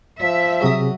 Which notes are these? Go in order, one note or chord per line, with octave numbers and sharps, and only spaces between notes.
F3 E5
C3 F#3 G#4 D#6